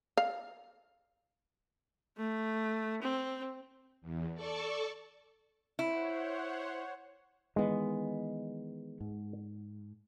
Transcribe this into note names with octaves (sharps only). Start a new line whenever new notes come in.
F5
A3
C4
E2
A4 D5 A5 C#6
E4 C5 C#5 F#5
D#3 E3 G#3 B3
G#2